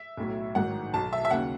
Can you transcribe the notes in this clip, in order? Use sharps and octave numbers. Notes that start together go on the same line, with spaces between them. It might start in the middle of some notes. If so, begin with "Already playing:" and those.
Already playing: E5
B1 A2 F#3
A1 G#2 D#3 F#3 F#5
B1 B2 F#3 A5
E5
E5
D#2 C#3 F#3 F#5